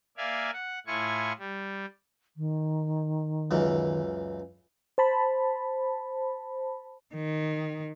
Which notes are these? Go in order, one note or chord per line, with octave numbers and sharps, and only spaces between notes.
A#3 D5 E5 F5 G#5
F#5
A2 E4 F4 G#5 C#6
G3
D#3
C#2 F#2 E3
C5 A5 B5
D#3